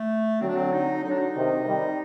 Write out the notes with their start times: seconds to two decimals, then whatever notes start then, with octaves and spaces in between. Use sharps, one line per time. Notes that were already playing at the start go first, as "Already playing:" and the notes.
Already playing: A3
0.41 D3 F#3 C4
0.49 D4
0.56 C4
0.72 D#4
1.03 D3 F#3 D#4
1.11 D4
1.19 D#4
1.35 C3 D#3
1.66 D#3 G3